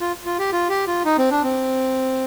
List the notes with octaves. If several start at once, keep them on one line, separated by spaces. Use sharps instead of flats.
F4
F4
G4
F4
G4
F4
D#4
C4
D4
C4